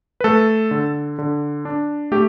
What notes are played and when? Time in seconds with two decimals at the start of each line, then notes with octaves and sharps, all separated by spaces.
0.20 B4
0.24 A3 A4
0.71 D3
1.19 D3
1.65 D4
2.12 A3 G4